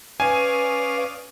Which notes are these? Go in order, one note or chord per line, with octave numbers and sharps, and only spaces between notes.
C#4 B4 D5 F5 G#5 D#6